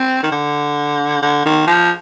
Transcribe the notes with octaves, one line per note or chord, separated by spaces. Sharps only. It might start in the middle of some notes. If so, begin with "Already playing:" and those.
Already playing: C4
D#3
D3
D3
D#3
F3